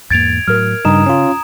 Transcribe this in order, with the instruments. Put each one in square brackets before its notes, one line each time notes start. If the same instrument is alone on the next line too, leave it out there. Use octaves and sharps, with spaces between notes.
[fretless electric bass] E2 G#2 A#3 [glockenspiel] G#6 D7 F7 [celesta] A6
[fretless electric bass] A2 F#3 [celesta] A#4 F6
[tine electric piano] G2 D#4 [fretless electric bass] C#3 [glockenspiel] A#5 D#6 E7
[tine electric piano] C#4 F4